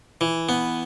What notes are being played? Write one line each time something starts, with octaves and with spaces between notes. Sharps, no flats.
E3
B3